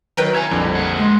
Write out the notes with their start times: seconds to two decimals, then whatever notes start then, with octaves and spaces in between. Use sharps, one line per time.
0.17 D#3 F#3 A#4 B4 G5
0.35 E4 G#5 A#5 G#6
0.51 A#1 F2 D3 G3
0.75 A#3 G#4 F#5
0.97 G#3